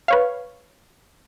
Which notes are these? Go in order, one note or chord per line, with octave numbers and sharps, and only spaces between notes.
B4 C#5 F5